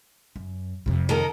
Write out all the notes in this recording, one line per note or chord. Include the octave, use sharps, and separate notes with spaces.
F#2
F2 C3
D#3 A4 A#4